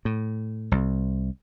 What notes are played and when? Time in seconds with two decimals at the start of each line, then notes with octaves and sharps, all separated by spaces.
0.05 A2
0.72 C2